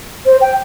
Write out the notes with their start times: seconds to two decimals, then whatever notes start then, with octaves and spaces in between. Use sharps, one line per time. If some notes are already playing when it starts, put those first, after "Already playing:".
0.26 C5
0.41 G5